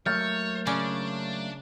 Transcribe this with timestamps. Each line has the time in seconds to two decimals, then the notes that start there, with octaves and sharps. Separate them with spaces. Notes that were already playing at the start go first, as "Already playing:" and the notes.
0.06 F#3 A3 A#3 C#5 F6 G6 A6
0.67 C#3 C#4 D4 D5